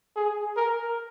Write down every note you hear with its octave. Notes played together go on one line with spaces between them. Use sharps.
G#4
A#4